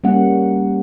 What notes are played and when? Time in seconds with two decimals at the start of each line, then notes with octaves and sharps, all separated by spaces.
0.04 G3 A#3 C#4 F#5